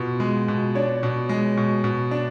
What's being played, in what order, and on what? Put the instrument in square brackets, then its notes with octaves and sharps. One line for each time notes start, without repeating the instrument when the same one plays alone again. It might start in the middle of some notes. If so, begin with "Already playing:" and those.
Already playing: [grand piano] B2 [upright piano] B3 F4
[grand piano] G#3
B2
[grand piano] D4 [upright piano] C#5
[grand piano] B2
G#3
B2
B2
D4